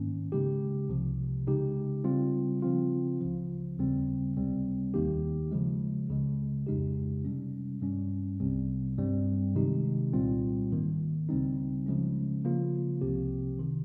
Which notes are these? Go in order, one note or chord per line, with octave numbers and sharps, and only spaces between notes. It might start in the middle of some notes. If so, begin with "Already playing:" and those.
Already playing: G#2 D#3 A#3 C#4
C#3 G#3 D#4 G4
C2 C3 F3
C#3 G#3 D#4 G4
C#3 G3 C4 F4
C#3 F3 C4 F4
C#2 C#3 F3
D#2 C#3 G3 C4
C#2 C3 G3 C4
D#2 D#3 A#3 D#4 G4
C#3 F3 G#3
C#2 C#3 G#3
F2 C#3 G#3 D#4 G4
C3 G3 C#4
G2 G3 C#4
C2 C3 G3 C4
G2 G3 C4
C3 D#3 G#3 D#4 G4
C2 A#2 G3 C4 F4
G#2 D#3 A#3
C#2 C#3 G3 C4 D#4
C#3 F3 G#3 C#4
C#3 F3 A#3 F4
C2 C3 F3 C4 G4
C3 D#3